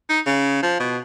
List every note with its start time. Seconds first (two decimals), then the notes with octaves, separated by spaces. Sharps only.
0.09 D#4
0.26 C#3
0.63 F3
0.80 B2